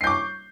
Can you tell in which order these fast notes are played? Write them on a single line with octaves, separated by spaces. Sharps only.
C7 G6 D6 C#6